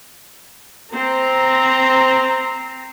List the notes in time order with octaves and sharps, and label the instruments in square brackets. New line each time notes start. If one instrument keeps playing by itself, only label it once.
[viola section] C4 A#5